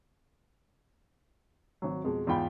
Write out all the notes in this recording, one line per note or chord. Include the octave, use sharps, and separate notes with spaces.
G#1 F#3
F2 B2 G#3
E2 G#2 F4 G5 B5